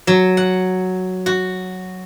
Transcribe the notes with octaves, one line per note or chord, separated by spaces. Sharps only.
F#3
F#5
F#4